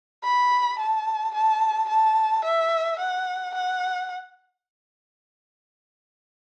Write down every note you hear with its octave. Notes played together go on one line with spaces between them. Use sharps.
B5
A5
A5
A5
E5
F#5
F#5